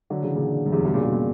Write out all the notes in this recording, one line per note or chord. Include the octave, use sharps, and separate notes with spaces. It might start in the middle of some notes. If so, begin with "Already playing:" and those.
D3 F#3
C#3 E3
A#2 C#3
F#2
E2 G2
G2 B2
A#2 C#3
G2 B2
A#2